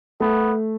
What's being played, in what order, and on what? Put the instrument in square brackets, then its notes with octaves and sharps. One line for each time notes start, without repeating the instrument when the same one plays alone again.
[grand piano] A3 [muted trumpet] B3